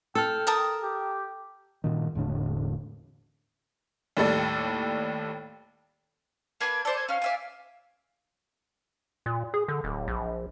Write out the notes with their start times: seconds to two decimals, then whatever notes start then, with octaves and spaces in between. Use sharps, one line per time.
0.15 A4 G5 E6 F6
0.47 A#4 A5 D#6
0.83 G4
1.84 G2 A#2 D#3
2.15 E1 A2 D3 D4
4.17 D#2 A2 G3 A4 D5
6.61 A#3 D4 B4 G#6
6.85 A4 C5 D5
6.96 G#6
7.09 C#4 F5 F6
7.22 D5 E5 G#5
9.26 A#2
9.54 G#4
9.68 D3
9.84 D1
10.08 A#1